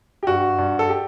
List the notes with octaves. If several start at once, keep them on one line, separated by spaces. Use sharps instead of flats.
G4
G2 F#4
G2
A4
G4